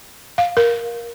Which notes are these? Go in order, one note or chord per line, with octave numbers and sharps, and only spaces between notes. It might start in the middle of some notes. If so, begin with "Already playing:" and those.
F5
A#4